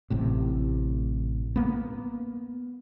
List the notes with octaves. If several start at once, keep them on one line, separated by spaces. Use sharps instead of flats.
A1 A2 C3
A#3 B3